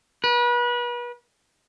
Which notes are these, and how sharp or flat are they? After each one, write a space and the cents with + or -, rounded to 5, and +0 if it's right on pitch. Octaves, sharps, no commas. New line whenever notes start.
B4 -35